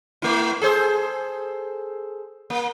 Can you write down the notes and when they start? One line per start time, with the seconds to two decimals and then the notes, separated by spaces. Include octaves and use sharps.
0.22 A3 E4
0.62 G#4 A4 C5
2.50 A#3